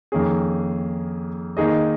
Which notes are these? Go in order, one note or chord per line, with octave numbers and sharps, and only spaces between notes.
F2 D#3 A#3 C#4 G#4
D#3 A#3 D#4 G#4 D#5